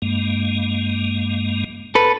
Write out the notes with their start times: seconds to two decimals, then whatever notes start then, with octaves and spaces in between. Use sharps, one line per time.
0.02 G2 G#3 A#3
1.95 A4 B4